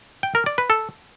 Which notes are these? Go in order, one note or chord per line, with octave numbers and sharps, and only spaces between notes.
G5
A#4
D5
B4
A4